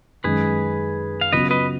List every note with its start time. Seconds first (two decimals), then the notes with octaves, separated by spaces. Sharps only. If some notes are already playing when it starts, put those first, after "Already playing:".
0.24 F#2 D#3 G#3 C#4 G#4 B4
1.21 F5
1.32 C#3 F#3 B3 F4 B4 D#5
1.51 B4 D#5